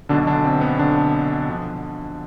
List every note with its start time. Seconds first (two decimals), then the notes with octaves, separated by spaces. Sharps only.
0.09 B1 B2 D3 D4
0.27 D3 D4
0.44 C4
0.61 B3
0.79 D3 D4
1.49 D3 F3